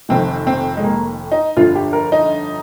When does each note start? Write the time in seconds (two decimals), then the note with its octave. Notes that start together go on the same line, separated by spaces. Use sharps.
0.09 F1 F2 D#3 C4
0.47 C4
0.77 G#3
0.83 A#3
1.32 D#4
1.56 G1 F2 D3 F3 F4
1.75 G4
1.93 A#4
2.12 D#4